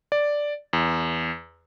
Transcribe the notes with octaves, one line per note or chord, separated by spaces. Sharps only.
D5
E2